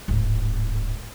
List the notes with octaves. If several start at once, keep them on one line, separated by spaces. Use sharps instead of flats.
D1 G#1